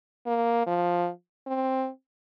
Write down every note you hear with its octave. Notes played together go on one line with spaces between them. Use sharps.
A#3
F3
C4